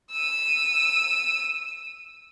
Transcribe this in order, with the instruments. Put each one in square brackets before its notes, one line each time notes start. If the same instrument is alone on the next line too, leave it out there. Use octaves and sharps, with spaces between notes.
[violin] E6 D#7